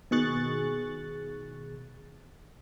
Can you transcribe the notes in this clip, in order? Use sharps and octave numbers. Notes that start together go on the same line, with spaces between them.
B2 D#3 G#4 C#6 F#6 A6